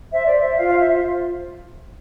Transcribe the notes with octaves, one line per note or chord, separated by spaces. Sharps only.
C5 E5
C5 D5
C5 E5
F4 F5
F5
C5
E5
F4